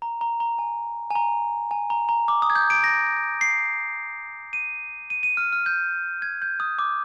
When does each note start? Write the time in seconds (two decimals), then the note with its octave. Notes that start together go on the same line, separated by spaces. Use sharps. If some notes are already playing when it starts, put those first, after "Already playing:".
0.02 A#5
0.21 A#5
0.40 A#5
0.59 G#5
1.11 G#5
1.15 A#5
1.71 G#5
1.90 A#5
2.09 A#5
2.28 D6
2.42 D#6
2.50 G#6
2.55 G6
2.70 D7
2.84 A#6
3.41 C7
4.53 D#7
5.10 D#7
5.23 D#7
5.37 F6
5.53 F6
5.66 G6
6.22 G#6
6.42 G6
6.60 D#6
6.79 D6